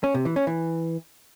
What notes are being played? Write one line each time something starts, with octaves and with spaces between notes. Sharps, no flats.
C#4
C3
E3
C#4
E3